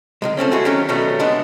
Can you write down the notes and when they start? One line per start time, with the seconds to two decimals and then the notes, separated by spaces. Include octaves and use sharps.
0.22 D#3 F#3 G#3
0.37 F3 A3 C4 C#4
0.51 G#3 A3 E4 F#4 G#4
0.65 D#3 F#3 C#4 G4
0.89 B2 D#3 F#3 G3 A3 B3
1.19 E3 G#3 B3 D4